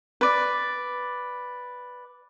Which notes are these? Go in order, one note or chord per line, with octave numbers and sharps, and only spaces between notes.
B4 D5